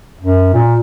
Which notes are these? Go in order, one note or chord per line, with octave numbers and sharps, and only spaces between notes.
F#2
A#2